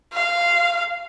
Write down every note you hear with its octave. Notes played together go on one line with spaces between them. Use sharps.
F5